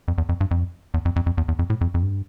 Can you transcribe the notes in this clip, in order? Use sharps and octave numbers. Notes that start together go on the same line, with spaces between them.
F2
E2
F2
G2
F2
E2
F2
F2
F2
E2
E2
F2
A2
F2
F2
G2